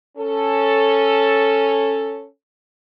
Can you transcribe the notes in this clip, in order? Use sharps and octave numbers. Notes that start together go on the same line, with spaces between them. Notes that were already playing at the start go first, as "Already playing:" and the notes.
C#4 A4